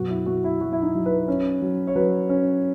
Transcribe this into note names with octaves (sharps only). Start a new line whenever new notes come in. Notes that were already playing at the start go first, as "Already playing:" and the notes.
Already playing: F#2 B2 F#4
E4
B2 F#4
E4
F#3 F#4
E4
D#4
F#3
B4
C#4
F#3
C#5
F#3 B4
C#4